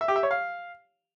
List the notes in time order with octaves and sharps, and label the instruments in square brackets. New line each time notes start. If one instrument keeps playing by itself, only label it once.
[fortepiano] E5
G4
E5
C#5
F5